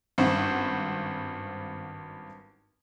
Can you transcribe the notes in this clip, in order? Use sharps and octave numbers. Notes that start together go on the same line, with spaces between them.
G#1 G2 C#4 C5 F#5